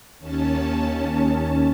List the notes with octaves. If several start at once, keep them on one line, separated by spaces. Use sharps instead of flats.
D#2 C#4 A5